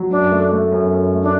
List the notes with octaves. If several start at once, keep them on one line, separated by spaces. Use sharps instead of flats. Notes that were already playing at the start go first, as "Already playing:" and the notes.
Already playing: F#3
F#2 D4
A3
A3
F#2
F#2
A3
D4